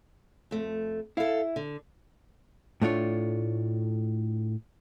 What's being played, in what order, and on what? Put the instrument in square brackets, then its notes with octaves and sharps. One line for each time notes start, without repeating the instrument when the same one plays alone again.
[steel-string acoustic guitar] F2 A3
[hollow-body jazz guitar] E4 [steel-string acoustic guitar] A4 F5
[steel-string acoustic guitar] D3
[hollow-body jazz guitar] A2 A3 D4 F4 C#5